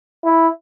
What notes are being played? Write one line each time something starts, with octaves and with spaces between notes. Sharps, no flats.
E4